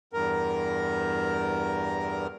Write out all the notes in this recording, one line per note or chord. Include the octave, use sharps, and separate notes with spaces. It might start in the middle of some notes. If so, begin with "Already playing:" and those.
E2 G2 A#4